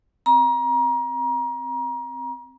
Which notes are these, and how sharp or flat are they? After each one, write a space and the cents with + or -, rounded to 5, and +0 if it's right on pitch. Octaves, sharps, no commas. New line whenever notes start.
C4 +0 A#5 +30